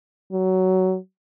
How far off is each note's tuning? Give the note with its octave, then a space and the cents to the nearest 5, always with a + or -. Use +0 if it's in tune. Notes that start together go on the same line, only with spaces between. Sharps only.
F#3 +15